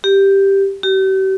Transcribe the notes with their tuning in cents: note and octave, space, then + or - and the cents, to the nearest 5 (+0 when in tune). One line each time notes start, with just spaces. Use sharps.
G4 +0
G4 -40